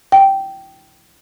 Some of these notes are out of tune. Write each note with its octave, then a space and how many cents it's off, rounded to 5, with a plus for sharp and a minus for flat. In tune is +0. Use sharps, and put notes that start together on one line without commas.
G5 -10